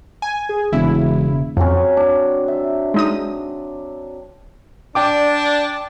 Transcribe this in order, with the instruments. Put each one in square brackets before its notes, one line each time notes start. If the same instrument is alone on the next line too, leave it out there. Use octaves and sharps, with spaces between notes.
[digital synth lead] G#5
[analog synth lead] G#4
[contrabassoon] E1 [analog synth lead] C#3 [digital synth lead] E4
[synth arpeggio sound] F2 [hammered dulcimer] F#3 C4 C#4
[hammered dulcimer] D4
E5
[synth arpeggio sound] G#3 D#4 D#6
[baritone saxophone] D4 [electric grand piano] D5 G5 D6